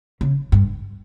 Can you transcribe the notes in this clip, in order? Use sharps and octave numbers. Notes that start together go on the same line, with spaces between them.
C#3
G2